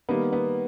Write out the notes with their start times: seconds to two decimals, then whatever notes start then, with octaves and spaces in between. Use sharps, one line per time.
0.09 D#3 G3 A#3 B3
0.33 B3